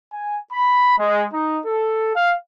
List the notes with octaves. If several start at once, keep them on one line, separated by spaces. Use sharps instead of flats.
G#5
B5
G#3
D#4
A4
F5